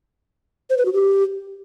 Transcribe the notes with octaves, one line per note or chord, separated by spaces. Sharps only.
C5
B4
F#4
G4